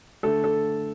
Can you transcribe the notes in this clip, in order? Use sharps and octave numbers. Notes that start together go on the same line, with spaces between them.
D3 A3 A4
A4